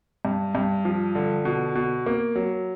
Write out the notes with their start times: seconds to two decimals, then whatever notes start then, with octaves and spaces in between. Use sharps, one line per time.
0.25 G2
0.55 G2
0.85 F3
1.15 D3
1.45 B2
1.75 B2
2.06 A#3
2.35 F#3